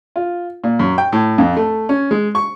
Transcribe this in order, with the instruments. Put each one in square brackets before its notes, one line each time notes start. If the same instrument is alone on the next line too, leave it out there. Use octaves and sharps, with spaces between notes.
[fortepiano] F4
A#2
F#2
G5
A2
F2
A3
C#4
G#3
C#6